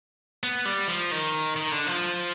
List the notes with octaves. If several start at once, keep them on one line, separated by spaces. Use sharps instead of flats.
B3
G3
F3
D#3
D#3
D3
F3